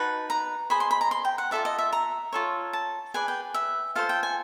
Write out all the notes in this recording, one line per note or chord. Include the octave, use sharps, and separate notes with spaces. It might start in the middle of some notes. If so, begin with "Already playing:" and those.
Already playing: D#4 F#4 B4 A5
A#5
G#4 C5 D#5 B5
C6
B5
A#5
C6
G5
F#5
F4 A4 D5 E5
D#5
E5
A#5
F4 A4 C#5
A5
G#4 B4 D5 G#5
G5
E5
F4 A4 C5 F5
G5
G#5